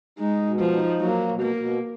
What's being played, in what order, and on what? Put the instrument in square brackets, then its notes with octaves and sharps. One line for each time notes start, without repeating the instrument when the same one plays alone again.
[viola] G#3 [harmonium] D#4
[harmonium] B2
[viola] F3
[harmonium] D#4
[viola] F#3 [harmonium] A#3
[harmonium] B2
[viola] A#3
[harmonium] B2